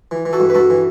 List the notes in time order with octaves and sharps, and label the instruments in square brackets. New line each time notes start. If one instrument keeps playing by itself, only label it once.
[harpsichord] E3
E3
F#4 A4
G2
B4
G2 F#4 A4
E3